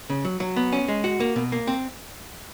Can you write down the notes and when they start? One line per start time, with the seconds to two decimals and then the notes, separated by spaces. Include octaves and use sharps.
0.10 C#3
0.25 F#3
0.40 F#3
0.56 B3
0.72 C#4
0.88 G#3
1.04 F#4
1.20 A#3
1.36 B2
1.52 A#3
1.68 C4